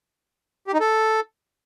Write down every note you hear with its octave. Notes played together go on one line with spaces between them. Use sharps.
G4
D#4
A4